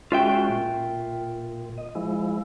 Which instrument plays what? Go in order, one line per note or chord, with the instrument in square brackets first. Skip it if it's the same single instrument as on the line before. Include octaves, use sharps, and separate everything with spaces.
[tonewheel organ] G#3 C#4 F#4 [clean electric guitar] F4 E5 G5
[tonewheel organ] A#2
D#5
F3 G#3 E4